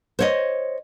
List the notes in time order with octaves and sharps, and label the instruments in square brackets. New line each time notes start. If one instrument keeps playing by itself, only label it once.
[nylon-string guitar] C5 C#5 D#5